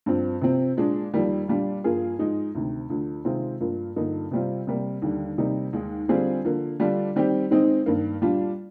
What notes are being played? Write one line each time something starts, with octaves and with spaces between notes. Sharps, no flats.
G2 F3 C4
C3 F3 C4
A#2 G#3 D4
F2 D#3 G3 A#3
A#2 G3 D4 F4
G2 F3 A#3 F4 G#4
G#2 F3 G#3 D#4
D2 C3 D#3
D2 D3 F3
C3 D#3 G#3 C4 F4
G2 F3 A#3 F4
G2 D3 F3 A#3 D#4
C3 G3 C4 F4
C3 G3 A#3
D#2 D3 G3
C3 D#3 G3 A#3 D#4
D#2 D#3 G#3
D3 G3 C4 F4 G#4
D3 F3 A#3
D3 G3 D4 F4
D#3 G3 C4 G4
D#3 G#3 C4 D#4
G2 D#3 A#3
A#2 G3 D4 F4